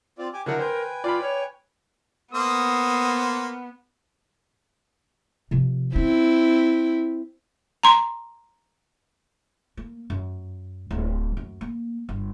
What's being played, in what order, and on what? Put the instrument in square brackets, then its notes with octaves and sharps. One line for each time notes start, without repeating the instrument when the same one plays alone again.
[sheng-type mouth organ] C4 F4 D5
G4 G#5 D6
[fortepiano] D3 F#3 F#4 [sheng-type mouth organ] D#4 E4 A4 [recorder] A#4
[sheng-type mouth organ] B4 G5 G#5 [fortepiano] C5
[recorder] F4 [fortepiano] D5 B5
[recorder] C#5
[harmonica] A#3 C5 [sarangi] B3 [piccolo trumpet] D#6
[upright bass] C3 F3
[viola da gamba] C4 E4 [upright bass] C#4
[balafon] A#5 C6
[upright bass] A#3
F#2
D1
F#2
A#3
G1